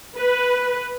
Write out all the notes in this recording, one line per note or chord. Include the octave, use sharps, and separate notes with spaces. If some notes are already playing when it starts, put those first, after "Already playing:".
B4